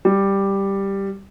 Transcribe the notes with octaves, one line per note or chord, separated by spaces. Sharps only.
G3